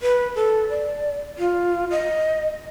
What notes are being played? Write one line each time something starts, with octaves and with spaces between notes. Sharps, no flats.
B4
A4
D5
F4
D#5